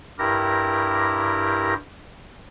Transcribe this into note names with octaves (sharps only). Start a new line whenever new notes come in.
G2 E4 G4 A#4 A#6